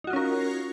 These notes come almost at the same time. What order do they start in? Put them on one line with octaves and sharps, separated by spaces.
D#4 F#4 F4 C#4 A#4